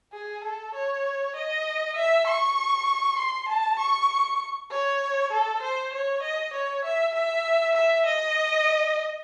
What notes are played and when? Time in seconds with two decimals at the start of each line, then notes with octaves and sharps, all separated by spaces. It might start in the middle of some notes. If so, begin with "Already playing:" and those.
0.13 G#4
0.44 A4
0.74 C#5
1.36 D#5
1.96 E5
2.27 C#6
3.19 C6
3.48 A5
3.79 C#6
4.71 C#5
5.32 A4
5.62 C5
5.93 C#5
6.23 D#5
6.53 C#5
6.84 E5
7.15 E5
7.75 E5
8.06 D#5